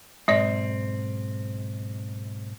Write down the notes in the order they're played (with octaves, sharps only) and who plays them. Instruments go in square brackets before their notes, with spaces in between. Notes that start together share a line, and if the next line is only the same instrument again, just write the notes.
[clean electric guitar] B1 G#2 C4 [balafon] G#3 D5